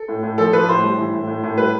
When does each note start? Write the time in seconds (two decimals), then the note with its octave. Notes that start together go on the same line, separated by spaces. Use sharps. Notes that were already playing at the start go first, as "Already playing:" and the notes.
Already playing: A4
0.08 A2
0.23 A2
0.38 F3 A4
0.53 F3 B4
0.68 A2 C5
0.83 G3
0.98 E3
1.14 A2
1.27 A2
1.44 A2
1.57 G3 B4